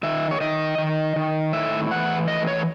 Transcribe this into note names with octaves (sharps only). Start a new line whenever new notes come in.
D#3 E5
C#5
D#3 D#5
D#3
D#3
A2 E5
E3 F#5
A2 D#5
C#5